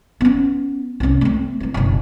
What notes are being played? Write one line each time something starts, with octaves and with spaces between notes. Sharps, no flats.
B3 C#4
C2 C#4
A3 C4
E3 A3
F#1 B1